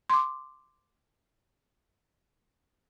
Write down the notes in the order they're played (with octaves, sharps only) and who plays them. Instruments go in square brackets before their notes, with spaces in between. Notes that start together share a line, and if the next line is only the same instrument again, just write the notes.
[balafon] C6 D6